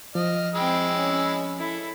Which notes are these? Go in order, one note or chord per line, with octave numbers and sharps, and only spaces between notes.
F3 D#5 F6
G#3 C4 G5 B5 E6
C#4
E4 A4